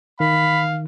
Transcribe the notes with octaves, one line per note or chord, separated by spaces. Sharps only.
D#3 F5 B5